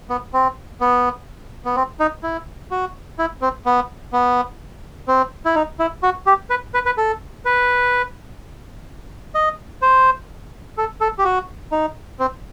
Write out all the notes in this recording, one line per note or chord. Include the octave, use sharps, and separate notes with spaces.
B3
C4
B3
B3
C4
D#4
E4
F#4
E4
C4
B3
B3
C4
E4
D#4
E4
F#4
G4
B4
B4
B4
A4
B4
D#5
C5
A4
A4
G4
F#4
D#4
C4